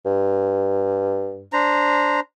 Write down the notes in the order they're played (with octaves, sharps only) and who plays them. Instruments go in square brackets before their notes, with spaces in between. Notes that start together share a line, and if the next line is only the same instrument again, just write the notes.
[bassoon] G2
[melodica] D4 C5 A#5